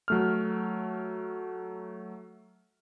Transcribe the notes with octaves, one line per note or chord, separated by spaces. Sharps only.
F#3 A3 F6